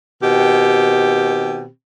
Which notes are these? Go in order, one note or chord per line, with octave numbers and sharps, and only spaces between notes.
B2 D#3 C4 G4